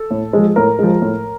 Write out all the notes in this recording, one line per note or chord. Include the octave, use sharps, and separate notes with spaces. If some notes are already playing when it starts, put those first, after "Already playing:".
Already playing: A4
A2
F3 G#3
A2 A#4
F3 G#3
A2